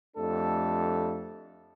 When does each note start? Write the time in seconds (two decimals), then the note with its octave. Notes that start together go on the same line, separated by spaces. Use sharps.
0.17 F2 A3 D4 G4 A4